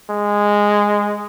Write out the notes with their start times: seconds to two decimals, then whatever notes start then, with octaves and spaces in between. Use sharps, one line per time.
0.11 G#3